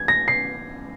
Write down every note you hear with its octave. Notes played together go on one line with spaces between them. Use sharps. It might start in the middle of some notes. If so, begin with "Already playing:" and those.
Already playing: G#6
A#6
C7